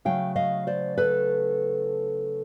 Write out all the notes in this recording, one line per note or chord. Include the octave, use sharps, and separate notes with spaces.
C#3 F#3 A3 F5 G5
D#5 F5
C5 D5
A4 B4